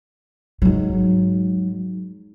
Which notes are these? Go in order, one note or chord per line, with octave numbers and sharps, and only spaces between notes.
G#2 F#3